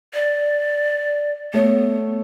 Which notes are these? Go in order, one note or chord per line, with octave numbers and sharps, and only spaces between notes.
D5
A3 B3 C#5